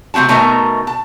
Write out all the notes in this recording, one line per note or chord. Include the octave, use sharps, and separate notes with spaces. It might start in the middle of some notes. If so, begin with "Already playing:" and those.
C3 A3 C4 F#4 A5
B2 A3 D#4 A#4 E5 G#5
A5